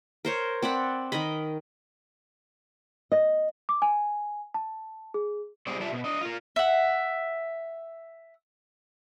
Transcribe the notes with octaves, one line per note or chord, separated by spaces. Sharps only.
A#4 C5 C#5
C4 D5 F#5 B5
D#3 A#4 D#5 B5
D#5
D6
G#5
A5
G#4
B2 G3 C4 G#4 D5
G3 F4 G4 D5 E5 A5
B2
D4 D#5
F4 A#4
E5 F#5